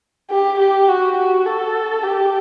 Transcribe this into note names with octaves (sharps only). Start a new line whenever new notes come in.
G4
G4
F#4
F#4
A4
G4